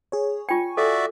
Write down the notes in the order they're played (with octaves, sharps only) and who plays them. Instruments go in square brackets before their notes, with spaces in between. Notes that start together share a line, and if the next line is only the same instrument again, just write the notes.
[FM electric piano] G#4 C#5
[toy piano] F4 G5 [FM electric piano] G#5 C#6
[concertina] F#4 D5 E5 [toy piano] A4